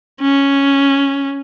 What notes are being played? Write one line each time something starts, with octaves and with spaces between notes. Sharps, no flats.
C#4